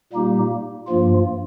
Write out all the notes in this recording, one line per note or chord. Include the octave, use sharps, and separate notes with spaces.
A#2 G3 A#3 D#4 G4
G2 F3 A#3 F4